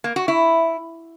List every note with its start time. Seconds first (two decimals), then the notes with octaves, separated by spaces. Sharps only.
0.04 A#3
0.16 F#4
0.28 E4